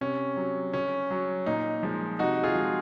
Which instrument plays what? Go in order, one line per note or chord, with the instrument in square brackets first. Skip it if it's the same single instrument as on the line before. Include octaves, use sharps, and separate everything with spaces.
[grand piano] C3 C#4
F#3
C#3 C#4
F#3
A#2 D#4
F3 G#3
C3 D#4 F#4
F4 G#4
F3 G#3